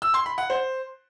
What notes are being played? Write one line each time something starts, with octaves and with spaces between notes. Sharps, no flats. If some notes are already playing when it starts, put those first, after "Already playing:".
E6
C6
B5
F#5
C5